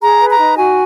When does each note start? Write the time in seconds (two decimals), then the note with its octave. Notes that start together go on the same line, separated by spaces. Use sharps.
0.02 G#4 A#5
0.20 B4
0.29 A#5
0.40 D#4
0.57 F#4 G#5